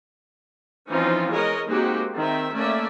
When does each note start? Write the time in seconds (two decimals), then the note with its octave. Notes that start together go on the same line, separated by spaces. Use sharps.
0.87 E3 F3 C4 C#4 D#4 F4
1.31 G#3 B3 A#4 C#5 D#5
1.66 G#3 A#3 C4 D#4 F#4 G4
2.15 D#3 C4 E5
2.51 A3 A#3 C#4 D5 E5